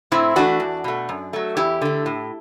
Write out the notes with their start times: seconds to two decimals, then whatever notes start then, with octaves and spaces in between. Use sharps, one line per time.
0.12 A2 C4 E4
0.36 E3 A3 D4 F#4
0.60 E2
0.84 B2 A3
1.09 F#2
1.33 F#3 A3
1.57 E2 E4 G4
1.81 D3 A3
2.06 A2